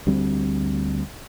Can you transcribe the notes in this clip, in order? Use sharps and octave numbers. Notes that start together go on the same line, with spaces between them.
D2 G3 C4